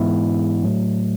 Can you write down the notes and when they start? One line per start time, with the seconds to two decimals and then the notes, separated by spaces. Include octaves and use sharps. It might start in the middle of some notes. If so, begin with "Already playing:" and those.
Already playing: G#2 E3 G#3 B3 E4
0.63 A2 F#3 A3